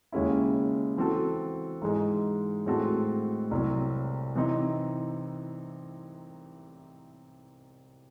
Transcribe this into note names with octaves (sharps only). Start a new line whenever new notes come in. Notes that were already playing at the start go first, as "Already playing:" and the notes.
D#2 C#3 G#3 C#4 E4
E3 C4 F#4 A4
G#2 E3 G#3 D#4
A2 G#3 C4 F#4 A4
C2 C3 F#3 C4
C3 E3 C4 D#4